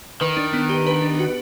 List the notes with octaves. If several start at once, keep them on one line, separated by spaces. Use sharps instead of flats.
D#3 B4
D4
B3
G4
B4
D4
F#4